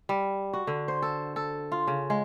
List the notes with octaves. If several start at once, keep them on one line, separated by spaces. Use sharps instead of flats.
G3
F#4
D3
C5
A4
A4
F4
C#3
G#3